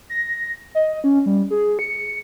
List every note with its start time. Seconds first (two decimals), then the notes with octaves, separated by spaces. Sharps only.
0.10 A#6
0.75 D#5
1.04 C#4
1.26 G3
1.51 G#4
1.79 C#7